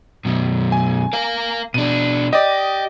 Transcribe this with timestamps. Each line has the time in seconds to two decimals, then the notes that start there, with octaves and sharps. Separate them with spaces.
0.25 F#2 B2
0.72 G#5
1.13 A#4 F5
1.74 B2 D4 D#7
2.33 G4 D5 D#5